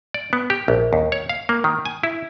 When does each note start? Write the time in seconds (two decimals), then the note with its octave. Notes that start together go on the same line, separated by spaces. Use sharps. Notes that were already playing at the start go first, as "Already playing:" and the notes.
0.14 D5
0.33 B3
0.50 G4
0.68 A#1
0.93 D#2
1.12 C#5
1.29 F5
1.49 A#3
1.64 D#3
1.85 G#5
2.03 E4